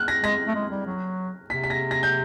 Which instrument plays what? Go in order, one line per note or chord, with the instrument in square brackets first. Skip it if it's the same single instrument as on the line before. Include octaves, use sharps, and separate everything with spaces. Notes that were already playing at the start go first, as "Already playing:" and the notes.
Already playing: [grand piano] F6 F#6
A#6
[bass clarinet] G#3 [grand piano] A#6
[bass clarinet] A3
G#3
G3
F#3
[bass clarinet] C3 [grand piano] B6
[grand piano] B6
A#6
A#6
G6